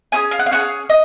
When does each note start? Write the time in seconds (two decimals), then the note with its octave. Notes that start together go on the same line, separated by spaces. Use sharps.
0.12 C#4 F4 G#4 G#5
0.31 F5
0.39 F#5
0.46 F5
0.51 C#4 F4 G#4 F#5
0.60 F5
0.90 D#5